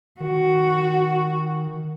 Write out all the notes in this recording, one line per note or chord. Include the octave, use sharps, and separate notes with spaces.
D#3 F#4